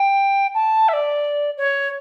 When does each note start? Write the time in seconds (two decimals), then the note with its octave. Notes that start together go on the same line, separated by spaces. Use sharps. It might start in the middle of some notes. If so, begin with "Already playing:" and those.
Already playing: G5
0.54 A5
0.88 E5
0.93 D5
1.57 C#5